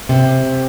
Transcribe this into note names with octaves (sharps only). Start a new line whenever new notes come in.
C3